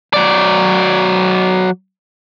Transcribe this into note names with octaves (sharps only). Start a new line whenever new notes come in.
F#3 D5